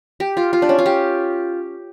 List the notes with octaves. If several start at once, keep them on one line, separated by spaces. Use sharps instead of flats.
G4
F4
F4
D4
C#4
F4
G4